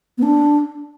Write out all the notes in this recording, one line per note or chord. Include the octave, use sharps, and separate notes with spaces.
B3
D4